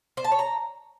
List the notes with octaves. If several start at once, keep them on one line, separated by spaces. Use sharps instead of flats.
C5
A5
C#5
A#5